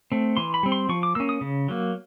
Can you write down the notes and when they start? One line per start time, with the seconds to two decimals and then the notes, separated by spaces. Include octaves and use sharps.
0.12 A3 C4
0.37 E3 C6
0.54 B5
0.63 G3 C4
0.72 C6
0.89 F3 C#6
1.03 D6
1.15 A#3 C#4 E6
1.29 D#6
1.41 C#3
1.68 F#3 A#3